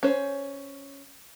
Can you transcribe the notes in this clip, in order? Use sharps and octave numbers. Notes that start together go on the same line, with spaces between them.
C#4 C5